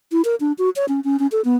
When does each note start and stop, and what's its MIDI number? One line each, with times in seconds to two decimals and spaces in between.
0.12 0.22 64
0.25 0.35 70
0.40 0.53 62
0.58 0.70 66
0.76 0.85 73
0.88 1.00 61
1.04 1.17 61
1.19 1.27 61
1.32 1.41 69
1.45 1.56 59